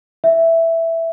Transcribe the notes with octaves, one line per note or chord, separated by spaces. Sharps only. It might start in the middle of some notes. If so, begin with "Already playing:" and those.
E5